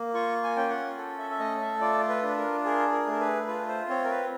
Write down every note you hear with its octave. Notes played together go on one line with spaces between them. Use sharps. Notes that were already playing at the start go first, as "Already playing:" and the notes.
Already playing: A#3
F4 C#6
G#5
C#4 G5
F#5
A4
E5
E5
A3 D#5
E5
F4 D5
B4
D4
B4
A#4
G#4 A#4
A#4
A3 A#4
B4
F4 B4
C5
C4 C#5
A#4
B4